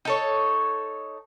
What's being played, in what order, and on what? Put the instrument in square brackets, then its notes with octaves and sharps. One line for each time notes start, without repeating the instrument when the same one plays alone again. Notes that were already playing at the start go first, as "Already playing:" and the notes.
[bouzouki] D#4 A4 C#5